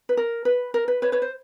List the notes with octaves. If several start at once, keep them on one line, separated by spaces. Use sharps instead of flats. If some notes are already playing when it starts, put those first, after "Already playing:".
B4
A#4
B4
A#4
B4
B4 C#5
B4 C#5
C5